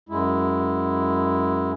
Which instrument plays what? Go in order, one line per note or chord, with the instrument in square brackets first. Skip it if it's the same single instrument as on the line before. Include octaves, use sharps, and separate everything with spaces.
[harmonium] F#2 G#3 E4